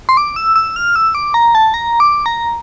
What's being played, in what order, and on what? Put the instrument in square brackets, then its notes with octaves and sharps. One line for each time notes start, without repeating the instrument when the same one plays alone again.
[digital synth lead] C6
D6
E6
E6
F6
E6
D6
A#5
A5
A#5
D6
A#5